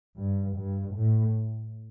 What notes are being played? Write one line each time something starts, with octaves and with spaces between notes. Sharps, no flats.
G2
G2
A2